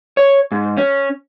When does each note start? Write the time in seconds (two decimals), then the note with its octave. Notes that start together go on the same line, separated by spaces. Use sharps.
0.17 C#5
0.52 G#2
0.77 C#4